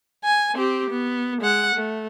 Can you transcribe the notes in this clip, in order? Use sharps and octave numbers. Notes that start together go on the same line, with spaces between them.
G#5
C4 G4
B3
G#3 F#5
A3